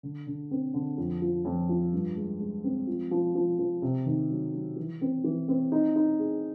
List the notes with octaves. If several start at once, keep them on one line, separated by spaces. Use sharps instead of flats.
D3
D3
C4
D3
F2
F3
F2
F3
G2
G#3
G#3
C4
F3
F3
F3
F3
C3
D#3
F#3
F#3
E3
C4
E3
C4
D#4
D#4
G#4